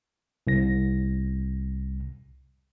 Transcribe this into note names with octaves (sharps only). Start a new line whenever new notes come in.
C2 A#6